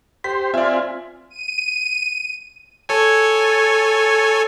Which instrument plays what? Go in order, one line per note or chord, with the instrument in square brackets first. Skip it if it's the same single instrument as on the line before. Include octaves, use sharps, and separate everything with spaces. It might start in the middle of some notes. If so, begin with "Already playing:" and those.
[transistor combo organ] G4 C5 [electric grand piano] B6
[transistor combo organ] C4 F4 G#5 [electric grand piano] D5 E5
[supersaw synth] D#7
[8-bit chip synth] A4 C#5 G#5